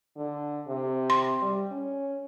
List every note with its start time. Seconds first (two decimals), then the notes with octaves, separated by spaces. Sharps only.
0.17 D3
0.68 C3
1.10 C6
1.42 G3
1.72 C#4